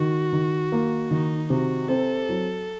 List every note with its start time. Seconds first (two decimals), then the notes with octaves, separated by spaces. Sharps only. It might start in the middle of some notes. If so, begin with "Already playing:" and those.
Already playing: D#3 F#4
0.33 D#3
0.72 A#3
1.11 D#3 D#4
1.50 C3 F#4
1.89 C4 A4
2.29 F#3